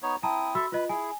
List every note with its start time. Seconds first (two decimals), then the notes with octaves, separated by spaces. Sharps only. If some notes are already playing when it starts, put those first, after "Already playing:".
0.03 B3 D#4 C#5
0.23 C4 E4 A5 A#5 D#6
0.55 F#4 A4 E5 B5 E6
0.72 F4 B4 D#5
0.89 E4 G#4 G#5